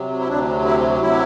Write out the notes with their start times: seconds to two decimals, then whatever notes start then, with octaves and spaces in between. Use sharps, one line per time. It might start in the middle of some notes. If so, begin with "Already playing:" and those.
Already playing: C3 F#3
0.19 E4
0.27 D2 C3 F#3 D4
0.64 E4
1.01 C3 F#3 E4